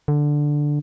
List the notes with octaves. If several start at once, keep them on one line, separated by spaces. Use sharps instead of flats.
D3